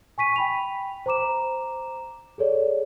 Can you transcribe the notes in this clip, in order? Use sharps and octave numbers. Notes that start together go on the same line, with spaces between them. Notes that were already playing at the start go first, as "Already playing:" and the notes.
G#5 C#6 B6 D#7
G5 B5 F7
C5 A#5 D6 E7
G#4 A4 C#5 D5